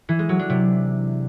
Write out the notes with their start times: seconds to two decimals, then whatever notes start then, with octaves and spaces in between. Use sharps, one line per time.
0.09 E3
0.19 G#3
0.29 F#3
0.39 D4
0.50 C3